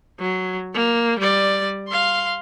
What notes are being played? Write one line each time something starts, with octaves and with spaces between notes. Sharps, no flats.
F#3
A#3
G3 D5
F5 C6